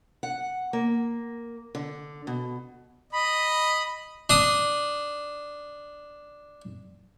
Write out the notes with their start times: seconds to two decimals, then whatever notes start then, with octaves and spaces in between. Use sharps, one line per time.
0.23 F#5
0.73 A#3
1.75 D3
2.27 B2
3.13 D#5 B5
4.30 D4 D#6